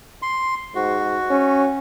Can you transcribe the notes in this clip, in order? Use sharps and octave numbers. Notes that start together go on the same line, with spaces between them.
C6
G#2 F#4
C#4